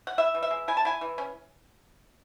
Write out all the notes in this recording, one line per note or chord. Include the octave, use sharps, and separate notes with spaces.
F#5
E4 E5
E3
E5
G#3
E4 G#5
A5
E4 G#5
E3
C#4